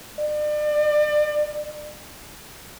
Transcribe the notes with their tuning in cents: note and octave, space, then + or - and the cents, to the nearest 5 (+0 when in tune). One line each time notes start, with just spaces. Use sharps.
D5 +35